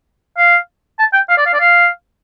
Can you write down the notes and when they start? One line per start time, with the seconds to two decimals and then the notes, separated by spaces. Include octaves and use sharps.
0.37 F5
0.99 A5
1.13 G5
1.29 F5
1.37 D5
1.46 F5
1.53 D5
1.60 F5